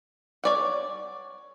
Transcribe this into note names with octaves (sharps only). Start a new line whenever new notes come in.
C#5 D5 F#5